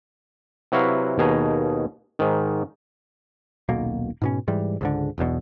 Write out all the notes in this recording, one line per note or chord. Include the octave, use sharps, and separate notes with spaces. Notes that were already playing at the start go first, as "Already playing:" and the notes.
C3 F#3 E4 F#4 B4 F5
D#2 B2 G#4 D#5 A#5
G#2 D#3
D#1 B1 B2 A#3
G#2 B2 C#4
G#2 E3 G3
C#2 G#2 D3
E1 B1 E2 B2